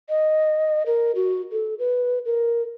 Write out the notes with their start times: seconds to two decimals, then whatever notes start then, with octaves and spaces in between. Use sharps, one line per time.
0.09 D#5
0.86 A#4
1.15 F#4
1.52 A4
1.79 B4
2.26 A#4